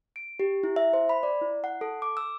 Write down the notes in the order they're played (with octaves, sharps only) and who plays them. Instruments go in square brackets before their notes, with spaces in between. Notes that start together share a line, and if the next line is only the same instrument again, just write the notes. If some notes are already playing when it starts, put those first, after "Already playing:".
[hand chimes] D7
G4
E4
E5
C5
B5
D5
E4
F#5
A4
D6
E6